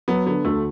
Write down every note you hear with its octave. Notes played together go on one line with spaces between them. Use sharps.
F#3 B3
D3 B3
D2 A3